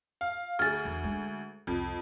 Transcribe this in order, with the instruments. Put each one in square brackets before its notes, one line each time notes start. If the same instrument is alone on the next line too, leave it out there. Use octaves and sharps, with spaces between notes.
[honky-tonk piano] F5
[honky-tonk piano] D2 G#4 [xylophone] F6 A6
[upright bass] E2
G#3 D4
[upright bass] C2 [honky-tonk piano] F2